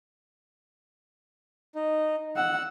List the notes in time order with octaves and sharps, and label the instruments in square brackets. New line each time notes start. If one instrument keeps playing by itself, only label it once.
[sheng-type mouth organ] D#4
[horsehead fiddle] F#5 [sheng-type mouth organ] E6